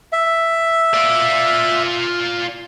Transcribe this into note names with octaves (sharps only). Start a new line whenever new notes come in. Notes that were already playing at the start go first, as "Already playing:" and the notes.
E5
F4 D5